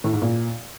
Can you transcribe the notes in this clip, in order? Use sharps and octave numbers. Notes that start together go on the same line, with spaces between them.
A2
G#2
A#2